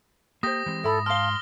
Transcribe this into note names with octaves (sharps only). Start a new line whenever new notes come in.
A#3 G4 C5 D#6 A#6
E3 G#3 C4
G#2 E4 A4 B5
F5 A5 C6 F6 G7